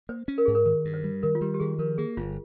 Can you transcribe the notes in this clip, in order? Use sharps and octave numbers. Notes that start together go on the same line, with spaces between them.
A#3 C5
C#4
A#4
G#2 G#4
A#4
D#3 A#4
G2
C5
G3
D#3 A#4
F4
G3 G4
G4
D#3 G#4
F3 A#4
A#3 G#4
G1 F4